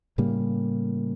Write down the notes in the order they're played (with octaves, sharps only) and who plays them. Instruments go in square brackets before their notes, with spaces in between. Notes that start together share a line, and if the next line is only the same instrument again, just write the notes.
[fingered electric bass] A2 C#3 G3 A#3